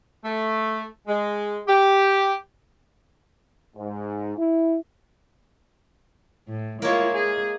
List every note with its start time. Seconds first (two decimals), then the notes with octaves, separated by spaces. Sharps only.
0.23 A3
1.07 G#3
1.67 G4
3.76 G#2
4.37 E4
6.48 A2
6.82 G#3 A#3 E4 F4 C#5
7.13 G#4